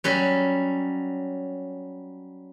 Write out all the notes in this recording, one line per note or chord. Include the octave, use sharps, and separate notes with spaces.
F#3 G3 C#4